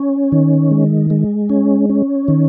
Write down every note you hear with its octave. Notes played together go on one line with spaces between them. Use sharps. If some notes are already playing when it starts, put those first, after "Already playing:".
Already playing: C#4
D#3
G#3
G#3
C#4
C#4
D#3